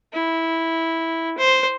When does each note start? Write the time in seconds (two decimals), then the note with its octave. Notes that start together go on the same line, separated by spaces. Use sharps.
0.13 E4
1.38 C5